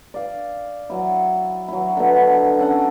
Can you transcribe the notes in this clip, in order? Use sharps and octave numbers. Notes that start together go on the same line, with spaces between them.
D5 F5
F#3 E4
F#3 E4
B2 D3
C#4 A4 F#5